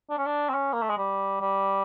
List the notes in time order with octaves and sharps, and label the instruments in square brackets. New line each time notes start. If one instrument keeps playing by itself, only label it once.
[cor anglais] D4
C#4
D4
C4
C#4
A#3
A3
G#3
G3
G3